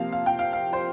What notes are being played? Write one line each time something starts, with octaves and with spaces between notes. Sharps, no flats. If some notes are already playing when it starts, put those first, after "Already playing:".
Already playing: C3 F3 A#3 F5
F5
G5
F5
F5
C5